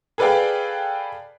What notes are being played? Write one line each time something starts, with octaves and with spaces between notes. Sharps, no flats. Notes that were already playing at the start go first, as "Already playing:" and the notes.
G#4 A4 B4 D5 F5 G5